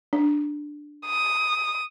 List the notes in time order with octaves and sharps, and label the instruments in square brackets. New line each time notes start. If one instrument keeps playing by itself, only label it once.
[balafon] D4
[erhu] D#6